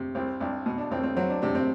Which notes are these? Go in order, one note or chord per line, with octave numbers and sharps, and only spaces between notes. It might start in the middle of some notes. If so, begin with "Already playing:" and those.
Already playing: C3
C2 C4
C2 D4
B2
D4
C2 C4
C4
F#3 C4
D4
C3 D4
C4